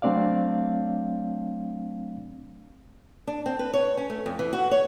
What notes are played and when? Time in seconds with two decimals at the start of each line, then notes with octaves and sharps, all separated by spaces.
0.02 F#3 A3 C4 D4 D5 F5
3.27 D4
3.46 C4
3.59 B4
3.73 C#5
3.97 C#4
4.10 A3
4.26 F2
4.39 E3
4.53 F#4
4.71 C#5